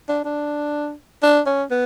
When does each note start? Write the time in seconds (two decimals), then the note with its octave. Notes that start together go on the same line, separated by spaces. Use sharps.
0.09 D4
0.25 D4
1.23 D4
1.46 C#4
1.71 B3